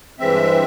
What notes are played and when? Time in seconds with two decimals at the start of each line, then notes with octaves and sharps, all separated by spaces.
0.19 G2 E3 G#3 C4 E5